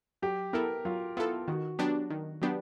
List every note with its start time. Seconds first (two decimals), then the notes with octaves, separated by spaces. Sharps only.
0.22 F#3 G4
0.53 B3 E4 A4 A#4
0.85 F#3 F4
1.17 B3 E4 F4 A4
1.48 D#3 F#4
1.79 F#3 B3 D4 G4
2.10 D#3
2.42 F#3 B3 D4 G4